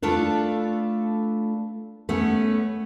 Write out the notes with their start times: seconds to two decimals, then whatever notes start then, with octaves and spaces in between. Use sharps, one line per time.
0.02 A3 D4 F4 A4 B4
2.09 A3 B3 C#4